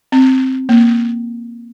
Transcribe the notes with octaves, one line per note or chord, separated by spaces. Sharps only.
C4
A#3